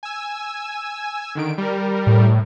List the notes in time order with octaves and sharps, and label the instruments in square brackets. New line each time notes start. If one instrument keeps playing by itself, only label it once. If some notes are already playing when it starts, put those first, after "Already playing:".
[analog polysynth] G#5 E6
D3 D#3 D7
G3 A#4
[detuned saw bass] A2